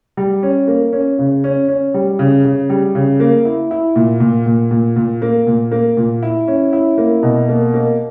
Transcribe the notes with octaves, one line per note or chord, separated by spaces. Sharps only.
G3
C#4
A#3
C#4
C#3
C#4
C#4
G3
C#3
C#3
G3
C#3
A#3
E4
E4
A#2
A#2
A#2
A#2
A#2
A#3
A#2
A#3
A#2
E4
C#4
E4
A#3
B2
A#3
A#3